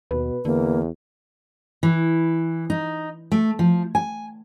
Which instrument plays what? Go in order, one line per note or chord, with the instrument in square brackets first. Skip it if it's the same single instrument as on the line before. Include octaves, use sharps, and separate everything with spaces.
[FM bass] D#2 [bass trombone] B2 [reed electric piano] B4
[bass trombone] E2 [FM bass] D3 [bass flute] A#3
[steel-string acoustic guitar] E3
D#4
A3
F3
G#5